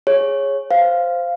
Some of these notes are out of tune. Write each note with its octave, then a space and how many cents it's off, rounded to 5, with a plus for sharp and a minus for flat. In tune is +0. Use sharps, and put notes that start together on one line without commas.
G#4 +0 C#5 -10
C5 -10 F5 -5